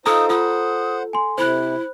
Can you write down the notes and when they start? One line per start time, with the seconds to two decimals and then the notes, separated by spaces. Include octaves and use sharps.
0.06 D#4 F4 A4 C5 A#5 D#6
0.29 F4 C5 F#5 D#6
1.13 G#5 C6
1.38 C3 E4 C5 B5 F#6